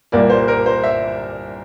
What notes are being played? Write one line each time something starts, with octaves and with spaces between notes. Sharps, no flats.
C2 A#2 G3 A#3 D5
C5
A#4
C5
E5